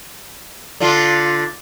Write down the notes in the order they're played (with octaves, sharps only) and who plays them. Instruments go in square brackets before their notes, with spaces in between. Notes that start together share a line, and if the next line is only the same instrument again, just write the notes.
[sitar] D3 D4 F4